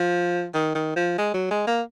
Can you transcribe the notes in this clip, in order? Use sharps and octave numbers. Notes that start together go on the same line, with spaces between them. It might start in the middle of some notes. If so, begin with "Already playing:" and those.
Already playing: F3
D#3
D#3
F3
G#3
F#3
G#3
A#3